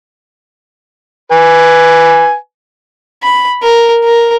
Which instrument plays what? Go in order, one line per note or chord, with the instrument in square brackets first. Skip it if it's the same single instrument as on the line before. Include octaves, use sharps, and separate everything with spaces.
[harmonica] B4 G#5
[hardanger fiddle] B5
A#4
A#4